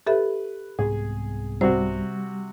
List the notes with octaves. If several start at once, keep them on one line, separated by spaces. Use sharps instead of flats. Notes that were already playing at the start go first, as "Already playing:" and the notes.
G4 A4 B4 E5
C2 G#2 B3 G#4
C3 G3 F#4 C5